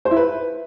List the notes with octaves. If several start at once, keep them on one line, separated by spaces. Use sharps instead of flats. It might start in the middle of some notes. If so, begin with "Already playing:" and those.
C5
E4
B4